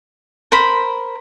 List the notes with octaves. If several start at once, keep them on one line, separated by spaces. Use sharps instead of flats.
A#4 C5 B5